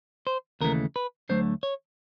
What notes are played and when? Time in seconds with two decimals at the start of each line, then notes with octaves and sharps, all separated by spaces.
0.27 C5
0.61 D#2 C#3 E3 A3 A#4
0.96 B4
1.29 D2 D3 F#3 A3 C5
1.63 C#5